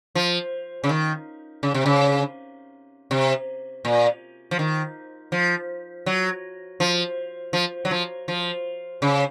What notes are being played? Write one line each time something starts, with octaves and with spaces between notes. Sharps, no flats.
F3
C#3
D#3
C#3
C3
C#3
C3
A#2
F3
D#3
F3
F#3
F3
F3
F#3
F3
F3
C#3